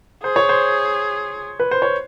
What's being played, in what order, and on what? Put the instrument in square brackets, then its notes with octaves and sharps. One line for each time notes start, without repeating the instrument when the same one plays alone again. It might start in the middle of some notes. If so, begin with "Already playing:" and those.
[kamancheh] G#4 [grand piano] C5
[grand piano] C#5
C5
B4
C5
C#5